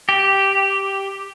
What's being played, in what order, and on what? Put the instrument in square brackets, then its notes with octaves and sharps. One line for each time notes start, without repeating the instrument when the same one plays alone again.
[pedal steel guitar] G4